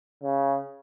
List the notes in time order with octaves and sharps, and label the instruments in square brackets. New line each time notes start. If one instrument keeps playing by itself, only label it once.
[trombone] C#3